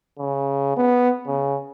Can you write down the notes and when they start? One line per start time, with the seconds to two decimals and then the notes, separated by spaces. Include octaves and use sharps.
0.19 C#3
0.77 B3
1.27 C#3